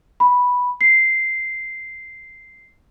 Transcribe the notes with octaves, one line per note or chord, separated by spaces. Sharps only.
B5
C7